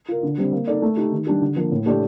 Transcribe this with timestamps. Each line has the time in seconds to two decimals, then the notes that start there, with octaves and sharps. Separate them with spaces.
0.08 F4 A#4
0.23 D3
0.38 G3 C4
0.52 A#3
0.67 D#4 A4 D5
0.82 A3
0.97 D#4 G4
1.12 D#3
1.27 G3 D4 G4
1.41 D3
1.56 F3 A#3 D4
1.71 A2
1.86 A3 D4 G4 D5